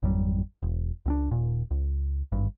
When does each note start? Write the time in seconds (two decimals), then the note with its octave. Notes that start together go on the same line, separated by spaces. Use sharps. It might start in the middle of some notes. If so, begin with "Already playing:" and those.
0.03 G#1 F2 F#3 G3
0.63 E1
1.06 C#2 C4 D4
1.31 D#1 A#2
1.71 C#2
2.32 G#1 G2